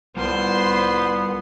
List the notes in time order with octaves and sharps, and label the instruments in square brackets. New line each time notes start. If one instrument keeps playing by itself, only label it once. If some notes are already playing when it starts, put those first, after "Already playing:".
[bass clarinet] C2 [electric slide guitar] G3 F4 [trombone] B3 [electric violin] C5 C6